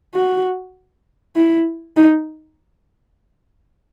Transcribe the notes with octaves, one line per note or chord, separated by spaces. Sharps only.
F#4
E4
D#4